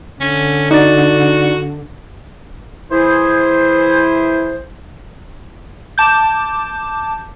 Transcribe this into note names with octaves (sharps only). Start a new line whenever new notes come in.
D3 C#4
D#4 F#4 D5 A6
E3 E4 G#4 C5
A5 D6 G6